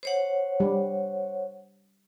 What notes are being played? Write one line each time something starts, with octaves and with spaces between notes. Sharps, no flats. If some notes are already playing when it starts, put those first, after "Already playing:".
C5 C#5 F#5
G3